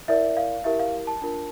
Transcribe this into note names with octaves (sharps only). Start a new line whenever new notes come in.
E4 A#4 D5 E5
F5
E4 G4 A#4 E5
F5
A5
D4 F4 A#4